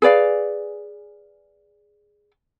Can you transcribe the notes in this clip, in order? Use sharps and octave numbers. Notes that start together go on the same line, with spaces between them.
G#4 B4 D5 F5